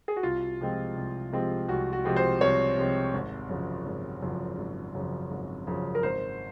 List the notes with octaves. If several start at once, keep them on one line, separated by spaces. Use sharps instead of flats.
G#4
F#4
C2 F4
C3 F3 G#3 C4
C2
C3 F3 G#3 C4
C2 F#4
F#4
C3 F3 G#3 C4
C5
C2 C#5
C3 F3 G#3 C4
G#1
F#2 C#3 F3
G#1
F#2 C#3 F3
G#1
F#2 C#3 F3
G#1
F#2 C#3 F3
A#4
G#1 C5